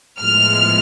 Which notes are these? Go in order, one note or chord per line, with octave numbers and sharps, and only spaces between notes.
A2 F3 G#3 B3 F6